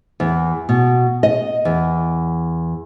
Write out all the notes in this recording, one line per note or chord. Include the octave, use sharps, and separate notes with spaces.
E2
B2
D#5
E2